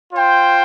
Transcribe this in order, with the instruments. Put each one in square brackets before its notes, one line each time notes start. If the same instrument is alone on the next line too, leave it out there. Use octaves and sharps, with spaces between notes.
[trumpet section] F4 C5 G5